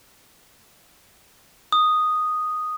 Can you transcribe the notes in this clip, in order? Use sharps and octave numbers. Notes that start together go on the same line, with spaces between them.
D#6